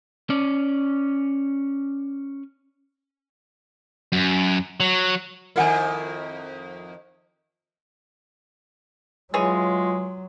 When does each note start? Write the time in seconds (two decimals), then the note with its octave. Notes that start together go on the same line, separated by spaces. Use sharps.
0.30 C#4 D5
4.12 F#2
4.80 F#3
5.56 F2 D#3 E4 A#4 F#5 G#5
9.34 E3 F#3 G#3 F4 G#4 C#5